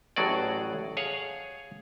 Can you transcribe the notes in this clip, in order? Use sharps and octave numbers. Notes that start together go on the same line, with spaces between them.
A1 A2 F#3 F#4 G#4 D5
G#4 C#5 F5 F#5